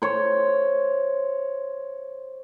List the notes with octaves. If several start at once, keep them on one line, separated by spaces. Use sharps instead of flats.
C5 C#5